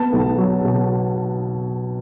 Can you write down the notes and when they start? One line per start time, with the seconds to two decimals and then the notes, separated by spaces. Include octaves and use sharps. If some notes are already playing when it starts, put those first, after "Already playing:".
Already playing: B3 A5
0.13 B1
0.38 F#3
0.65 B2